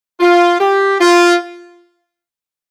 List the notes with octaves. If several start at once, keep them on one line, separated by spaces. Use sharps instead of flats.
F4
G4
F4